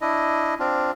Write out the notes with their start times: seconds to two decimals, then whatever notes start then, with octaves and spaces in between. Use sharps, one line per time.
0.01 D4 E4 D#5
0.60 C4 D4 F4